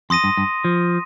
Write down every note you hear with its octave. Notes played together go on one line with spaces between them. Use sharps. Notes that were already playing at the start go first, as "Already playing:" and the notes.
F2 C6 D#6 A#6 D#7
G2
G2
F3